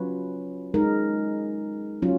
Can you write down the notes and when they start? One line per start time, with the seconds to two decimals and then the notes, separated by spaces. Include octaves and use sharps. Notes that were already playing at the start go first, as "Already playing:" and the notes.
Already playing: F#3 C#4 F4 B4
0.74 G#3 D#4 A#4
2.02 F#3 C#4 F4